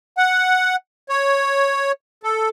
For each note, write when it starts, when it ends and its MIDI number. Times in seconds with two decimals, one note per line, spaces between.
0.18 0.76 78
1.09 1.92 73
2.23 2.49 69